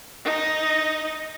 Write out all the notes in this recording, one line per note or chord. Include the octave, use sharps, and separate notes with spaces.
D#4 D#5